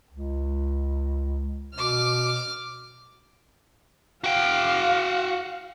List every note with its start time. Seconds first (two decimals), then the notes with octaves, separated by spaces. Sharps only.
0.11 C#2
1.74 B2 D6 F6
4.24 F#4 F5 G5